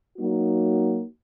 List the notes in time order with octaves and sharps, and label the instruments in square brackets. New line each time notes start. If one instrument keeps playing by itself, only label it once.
[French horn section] F#3 A#3 D#4 F#4